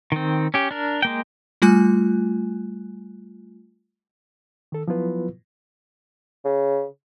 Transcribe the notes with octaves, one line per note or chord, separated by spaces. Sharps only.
D#3 C4
C#4 G4
D4 A#4
G#3 A#3 G5
G3 A3 F4 G#5 F#6
D#3 A4
F3 F#3 B3 E4 F4 B4
C#3